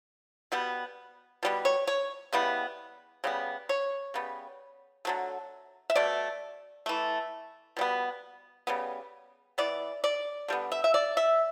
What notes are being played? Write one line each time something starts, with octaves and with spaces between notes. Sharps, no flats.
B2 G3 B3
B2 G3 B3
C#5
C#5
C#3 E3 G3 B3
C#3 G3 B3
C#5
C#3 G3 B3
D3 F#3 A3
E5
B2 A3 D5
E3 A3
B2 G3 B3
C#3 G3 B3
E3 B3 D5
D5
D3 G3 B3
E5
E5
D5
E5